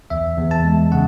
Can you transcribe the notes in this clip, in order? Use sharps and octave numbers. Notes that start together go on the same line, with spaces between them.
E2 E5
E2
A5
G#3
C#3 F#5